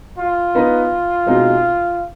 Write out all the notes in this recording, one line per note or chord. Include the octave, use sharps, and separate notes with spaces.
F4
B3 D#4 B4
B2 G#3 C4 D#4